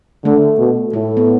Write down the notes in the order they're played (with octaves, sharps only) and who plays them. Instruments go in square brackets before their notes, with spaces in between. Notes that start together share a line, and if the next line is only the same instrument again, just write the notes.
[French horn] D3 [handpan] A3
[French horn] B2
[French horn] A2 [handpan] A3
[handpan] B3